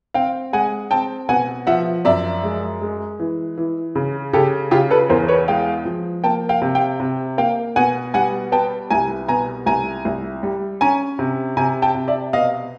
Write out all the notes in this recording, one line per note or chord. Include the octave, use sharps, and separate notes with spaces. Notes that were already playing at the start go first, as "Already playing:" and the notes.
C4 F5 G5
G#3 F#5 G#5
C4 G5 A5
B2 F#5 G#5
F3 E5 F#5
F#2 D5 E5
G#3
G#3
E3
E3
C#3
C#3 G4 A4
C#3 F4 G4
A4 B4
E2 A#4 C5
B4 C#5
G#3 F5 G5
F3
A#3 G5 A5
F5 G5
C3
F5 G5
C3
A#3 F5 G5
B2 F#5 G#5
G3 F#5 G#5
B3 G5 A5
C2 G#5 A#5
B2 G#5 A#5
C2 G#5 A#5
C2
G3
C#4 G#5 A#5
C3
C3 G#5 A#5
G5 A5
C3
D5 E5
B2 D#5 F5